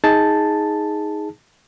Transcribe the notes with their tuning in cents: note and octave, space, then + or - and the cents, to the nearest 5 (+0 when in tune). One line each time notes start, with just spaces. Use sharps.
D#4 +15 G#4 +0 A5 +0